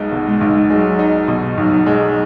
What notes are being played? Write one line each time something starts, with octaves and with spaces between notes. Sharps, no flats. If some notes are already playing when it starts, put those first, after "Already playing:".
Already playing: B1 B2 G#3 D#4
B2
G#3
B1
F#3 G#3
D#4
B2
B1 F#3
G#3